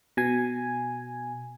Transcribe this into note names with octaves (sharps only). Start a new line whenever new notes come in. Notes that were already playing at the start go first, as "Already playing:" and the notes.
B2 G#5